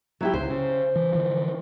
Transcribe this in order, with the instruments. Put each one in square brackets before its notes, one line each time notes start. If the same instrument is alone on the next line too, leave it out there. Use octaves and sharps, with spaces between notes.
[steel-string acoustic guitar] F#3 E4 G4
[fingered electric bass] C#2 [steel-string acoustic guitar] C5
[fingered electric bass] C#3
E3
D3 E3 F3